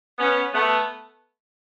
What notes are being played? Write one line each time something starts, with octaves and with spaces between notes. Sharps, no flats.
B3 C#4
A3 B3